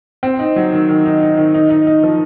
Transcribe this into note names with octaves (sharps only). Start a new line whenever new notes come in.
C4
D#4
F#3
D#3
D#3
D#4
D#4
D#3
D#4
D#4
D#4
F3